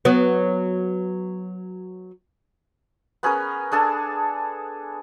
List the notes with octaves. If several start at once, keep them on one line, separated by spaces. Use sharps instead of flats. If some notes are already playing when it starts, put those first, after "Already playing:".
F#3 B3
B3 C#4 G#4 A#4
D4 G#4 A4 A5